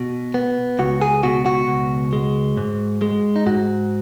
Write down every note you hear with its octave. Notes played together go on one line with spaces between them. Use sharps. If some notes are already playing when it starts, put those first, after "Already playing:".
Already playing: B2 F#4
B3
C#2 F#4
G#4
B2 F#4
F#4
C#2
G#3
G#2
G#3
D#4
G#2 F#4